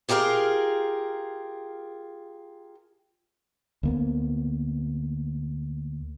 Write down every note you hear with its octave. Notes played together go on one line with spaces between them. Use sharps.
F4 G4 G#4 A#4 F5
D2 A#3 B3